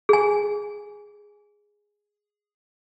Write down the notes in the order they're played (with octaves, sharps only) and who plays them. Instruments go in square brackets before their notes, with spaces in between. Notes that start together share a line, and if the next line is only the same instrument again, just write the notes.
[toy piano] G#4 G#5